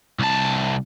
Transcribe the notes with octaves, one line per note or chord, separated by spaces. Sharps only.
C2 A5